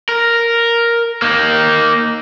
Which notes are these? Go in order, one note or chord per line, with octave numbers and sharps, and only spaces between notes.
A#4
A#3 D#4